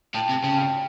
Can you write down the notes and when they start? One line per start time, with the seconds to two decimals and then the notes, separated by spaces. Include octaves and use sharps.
0.14 A2 G5 A5
0.29 C3
0.43 C#3 G5 A5
0.58 G5 A5